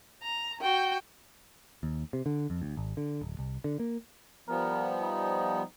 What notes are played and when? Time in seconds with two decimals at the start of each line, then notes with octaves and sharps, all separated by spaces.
0.23 A#5
0.61 F#4 G5
1.83 D#2
2.13 C3
2.26 D3
2.50 F2
2.62 D2
2.77 G#1
2.97 D3
3.21 D1
3.39 C2
3.64 D3
3.80 A#3
4.49 F3 G3 B3 A#4
5.01 D#4